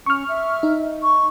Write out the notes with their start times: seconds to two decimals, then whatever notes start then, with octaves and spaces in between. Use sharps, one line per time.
0.06 C#4 C#6 F6
0.28 E5
0.63 D#4
1.03 C#6